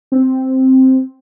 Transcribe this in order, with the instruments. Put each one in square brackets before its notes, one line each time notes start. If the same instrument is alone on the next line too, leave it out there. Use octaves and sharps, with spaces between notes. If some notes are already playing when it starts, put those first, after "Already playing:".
[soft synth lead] C4